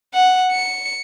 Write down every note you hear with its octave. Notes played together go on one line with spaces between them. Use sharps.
F#5
C#7